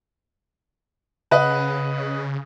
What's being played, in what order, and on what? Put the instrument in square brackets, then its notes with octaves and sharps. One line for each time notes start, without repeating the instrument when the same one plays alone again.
[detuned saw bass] C#3 [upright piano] B4 D#5 F#5